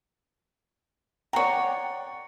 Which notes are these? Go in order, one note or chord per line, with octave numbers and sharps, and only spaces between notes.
C#5 D5 F#5 G5 A#5